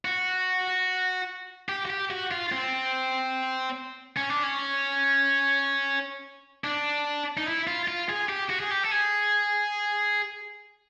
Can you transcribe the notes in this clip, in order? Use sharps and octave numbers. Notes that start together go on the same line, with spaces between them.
F#4
G4
F#4
G4
F#4
F4
C4
C#4
D4
C#4
D4
D#4
E4
F4
F4
G#4
G4
F#4
G#4
G4
A4
G#4